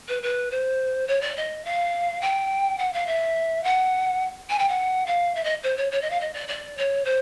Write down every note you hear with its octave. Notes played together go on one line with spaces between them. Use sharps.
B4
B4
C5
C#5
D5
D#5
F5
G5
F#5
F5
E5
F#5
G#5
G5
F#5
F5
E5
D#5
C5
C#5
C#5
D#5
F5
D#5
D5
D5
C#5
C5